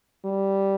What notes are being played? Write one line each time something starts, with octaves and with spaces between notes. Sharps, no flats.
G3